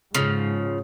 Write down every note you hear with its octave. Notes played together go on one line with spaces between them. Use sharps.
G#2 C#3 F3